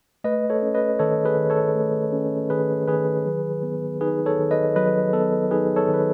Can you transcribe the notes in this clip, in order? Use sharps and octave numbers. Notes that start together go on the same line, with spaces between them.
A3 B4 D#5
A4 C#5
C#4
B4 D#5
D#3 A4 C#5
G#4 B4
D#3
A4 C#5
A3
C#4
D#3 G#4 B4
D#3 G#4 B4
F#3
B3
D#4 G#4 B4
A4 C#5
D#3
B4 D#5
F#3 B4 D#5
B3 A4
D#4 G#4 B4
A4 C#5
D#3
B4